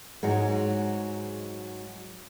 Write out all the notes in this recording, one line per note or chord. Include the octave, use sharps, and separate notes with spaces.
G#2 F#3 G#3